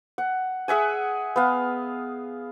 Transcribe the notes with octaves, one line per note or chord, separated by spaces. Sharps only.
F#5
G#4 E5 F#5 G#5
B3 F5